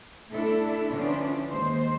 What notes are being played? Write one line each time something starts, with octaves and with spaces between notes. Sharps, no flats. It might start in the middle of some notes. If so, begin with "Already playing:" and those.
A3 D4 E4 A4
D3 E3 F3 C#4 D4
D#2 G#3 C5